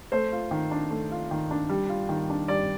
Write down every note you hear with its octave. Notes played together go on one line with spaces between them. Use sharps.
A3 C5
F4
D#3
D4
A3
F4
D#3
D4
G3
F4
D#3
D4
G3 D5